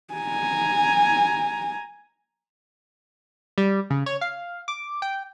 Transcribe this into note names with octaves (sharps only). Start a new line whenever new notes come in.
G#5 A#5
G3
C#3
C#5
F5
D6
G5